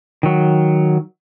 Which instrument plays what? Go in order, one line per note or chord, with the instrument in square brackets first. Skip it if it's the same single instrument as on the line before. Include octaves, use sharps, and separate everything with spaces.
[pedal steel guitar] D#3 F#3